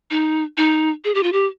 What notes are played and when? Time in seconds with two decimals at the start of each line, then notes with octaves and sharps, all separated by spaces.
0.11 D#4
0.57 D#4
1.05 G#4
1.15 G4
1.23 F4
1.32 G4